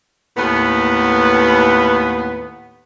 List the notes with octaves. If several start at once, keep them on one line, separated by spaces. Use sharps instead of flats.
D#2 A2 B3